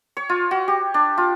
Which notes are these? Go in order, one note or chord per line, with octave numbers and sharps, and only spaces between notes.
C#5
F4
F#4
G4
D4
F4